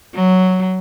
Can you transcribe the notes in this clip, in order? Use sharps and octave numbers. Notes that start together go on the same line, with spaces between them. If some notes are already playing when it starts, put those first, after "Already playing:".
F#3